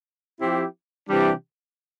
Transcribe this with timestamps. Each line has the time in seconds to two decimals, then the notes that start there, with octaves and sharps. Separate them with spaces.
0.41 F3 C4 E4 G4
1.08 C3 E3 G3 D4 G4